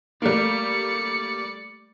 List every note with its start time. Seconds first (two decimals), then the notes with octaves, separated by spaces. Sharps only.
0.22 G3 A3 A#3 D5 C#7